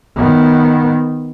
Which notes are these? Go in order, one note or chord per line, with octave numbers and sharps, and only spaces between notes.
D#3 B3